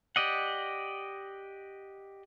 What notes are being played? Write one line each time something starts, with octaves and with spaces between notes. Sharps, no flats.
G4 D5 D#5 F#5